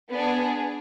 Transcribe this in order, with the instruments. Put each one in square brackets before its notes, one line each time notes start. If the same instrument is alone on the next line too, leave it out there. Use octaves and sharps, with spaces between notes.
[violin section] B3 D4 G#4